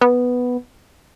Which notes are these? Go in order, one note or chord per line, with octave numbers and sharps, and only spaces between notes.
B3